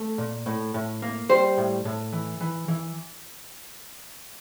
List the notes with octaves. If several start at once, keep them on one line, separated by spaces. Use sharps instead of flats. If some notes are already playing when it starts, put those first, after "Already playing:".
Already playing: A3
A#2
A2
A2
A#3
G3 C5
A2
A2
E3
E3
E3